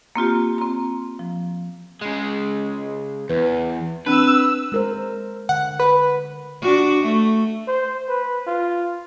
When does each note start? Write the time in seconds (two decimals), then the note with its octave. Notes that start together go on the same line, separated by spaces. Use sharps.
0.15 A#3 C4 F4 G4
0.58 C4 A#5
1.19 F3
2.01 C#3 G#3
3.29 E2 B4
4.06 C4 D4 B4 E6
4.72 G#3 A#4 C5
5.49 D3 F#5
5.80 B4
6.61 D4 F#4
7.02 A3
7.68 C5
8.09 B4
8.47 F4